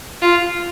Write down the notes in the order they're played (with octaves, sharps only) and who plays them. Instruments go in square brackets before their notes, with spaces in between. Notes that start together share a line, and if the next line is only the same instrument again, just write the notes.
[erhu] F4